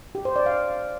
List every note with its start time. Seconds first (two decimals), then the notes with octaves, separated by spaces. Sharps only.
0.15 G4
0.25 C5
0.36 D5
0.46 F5